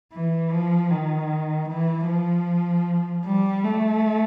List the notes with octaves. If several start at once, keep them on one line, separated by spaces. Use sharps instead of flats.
E3
F3
D#3
E3
F3
G3
A3